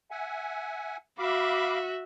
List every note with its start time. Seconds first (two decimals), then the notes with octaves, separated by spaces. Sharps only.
0.11 E5 F#5 G#5
1.18 F#4 E5 F5 B5 D6